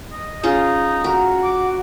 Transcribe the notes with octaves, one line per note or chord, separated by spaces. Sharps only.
D#5
C#4 D#4 F4 G#4
F#4 A#4
D6